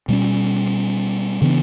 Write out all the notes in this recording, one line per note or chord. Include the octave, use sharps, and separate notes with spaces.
B2 G3 C#4
C#3 E3 B3 D4